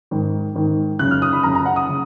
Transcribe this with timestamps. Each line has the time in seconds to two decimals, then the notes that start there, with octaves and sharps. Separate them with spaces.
0.11 G#2 D#3
0.55 G#2 D#3
0.99 C#3 F#6
1.02 F#2
1.11 F6
1.22 D#6
1.33 B5
1.43 F#2 C#3 A#5
1.55 A#5
1.66 F#5
1.76 D#6
1.89 C#3